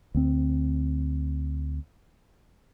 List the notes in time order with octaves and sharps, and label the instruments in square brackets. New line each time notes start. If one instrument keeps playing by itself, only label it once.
[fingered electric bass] D2 C4